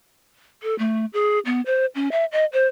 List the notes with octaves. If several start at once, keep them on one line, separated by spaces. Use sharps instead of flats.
A4
A3
G#4
B3
C5
C#4
E5
D#5
C5